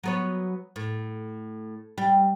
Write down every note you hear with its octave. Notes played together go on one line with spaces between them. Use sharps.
F#3 B3 C#5
A2
G3